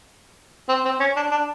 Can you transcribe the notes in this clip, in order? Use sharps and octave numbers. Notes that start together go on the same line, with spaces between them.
C4
C4
C#4
D4
D4